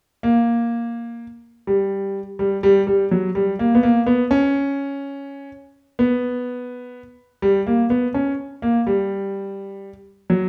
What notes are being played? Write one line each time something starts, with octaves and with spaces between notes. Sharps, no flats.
A#3
G3
G3
G3
G3
F#3
G3
A#3
B3
A#3
B3
C#4
B3
G3
A#3
B3
C#4
A#3
G3
F#3